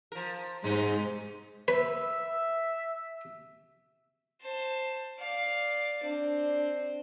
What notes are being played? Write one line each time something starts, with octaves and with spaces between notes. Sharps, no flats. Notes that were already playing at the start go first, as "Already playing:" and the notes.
F3 A#4
G#2 B2 D#4
B4 E5
C5 A5
D5 F5
C4 D4